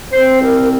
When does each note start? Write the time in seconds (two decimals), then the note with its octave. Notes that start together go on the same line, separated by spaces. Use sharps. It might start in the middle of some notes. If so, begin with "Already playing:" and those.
0.12 C4 C5
0.41 C2 A#4